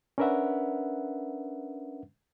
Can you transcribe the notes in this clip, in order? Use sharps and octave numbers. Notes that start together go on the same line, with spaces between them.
C#4 D4 A#4 B4 E5 F#5